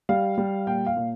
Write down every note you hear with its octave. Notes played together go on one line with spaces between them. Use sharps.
G3 F5
G3
A#2 G5
F5
A#2